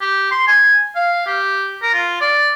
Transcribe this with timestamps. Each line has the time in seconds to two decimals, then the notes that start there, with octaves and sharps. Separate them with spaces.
0.01 G4
0.31 C6
0.47 G#5
0.96 F5
1.27 G4
1.82 A#4
1.94 F4
2.21 D5